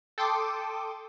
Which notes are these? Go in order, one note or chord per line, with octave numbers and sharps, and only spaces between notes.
A4 G5 C6 D6 D#6